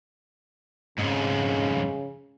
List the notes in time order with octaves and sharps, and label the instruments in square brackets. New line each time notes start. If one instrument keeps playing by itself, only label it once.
[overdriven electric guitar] F2 G#2 [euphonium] C#3